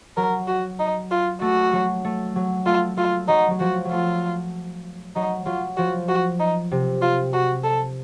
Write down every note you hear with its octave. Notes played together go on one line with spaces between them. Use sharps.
F#3 A#4
F#4
D#4
F4
A3 F#4
F#3
A3
F#3
A3 F4
A3 F4
F#3 D#4
F#3
F3 F#4
F#3
A3 F4
F#3 D#4
F#3 F4
F3 F#4
F#4
D#4
C3
F4
F#4
A4